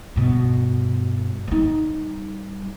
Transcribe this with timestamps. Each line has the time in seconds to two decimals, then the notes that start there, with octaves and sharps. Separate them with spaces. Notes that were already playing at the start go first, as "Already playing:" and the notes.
0.16 G2 B2
1.48 G3 D#4